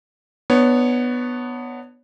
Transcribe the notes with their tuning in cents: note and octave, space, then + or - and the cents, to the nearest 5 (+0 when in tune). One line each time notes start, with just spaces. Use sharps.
B3 +0 D4 +30 C#5 +0